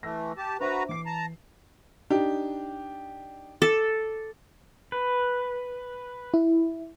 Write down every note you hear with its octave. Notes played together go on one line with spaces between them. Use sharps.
E3 A3 E6 A#6
G4 A5
D4 F#4 B4 C5 E5 A#5
E3 D6 C7
A5 A#5
D4 D#4 G4
A4 D6
B4
E4